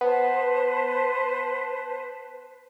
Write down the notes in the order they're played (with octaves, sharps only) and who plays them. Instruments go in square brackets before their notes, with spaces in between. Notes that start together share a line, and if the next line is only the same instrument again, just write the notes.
[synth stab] B3 [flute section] B4 C5 A5